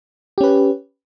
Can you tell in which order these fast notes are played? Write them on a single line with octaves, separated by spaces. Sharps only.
G4 C#4 B4